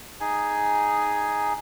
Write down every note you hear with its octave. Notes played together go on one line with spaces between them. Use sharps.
D#4 G#4 G#5